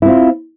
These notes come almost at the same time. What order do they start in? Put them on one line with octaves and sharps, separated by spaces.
E4 C4 F4